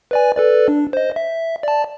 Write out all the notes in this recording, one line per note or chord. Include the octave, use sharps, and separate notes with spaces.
B4 D5 G#5
A4 B4 D5
D4
C5 D#5
E5
D5 A5